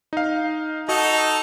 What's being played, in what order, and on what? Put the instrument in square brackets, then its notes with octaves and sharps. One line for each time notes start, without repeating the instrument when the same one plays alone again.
[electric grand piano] D#4 F5
[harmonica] D#4 A4 D#5 [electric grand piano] F#4